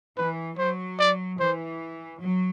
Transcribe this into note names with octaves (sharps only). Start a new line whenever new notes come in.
E3 B4
F#3 C5
D5
E3 C5
F#3